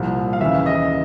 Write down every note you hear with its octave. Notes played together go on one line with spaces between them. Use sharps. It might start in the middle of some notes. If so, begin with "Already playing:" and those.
Already playing: C2 A#2 F3
F5
D#2 C#3 E3 E5
D#5